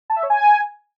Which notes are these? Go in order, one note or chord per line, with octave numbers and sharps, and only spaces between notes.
A5
E5
C#5
G#5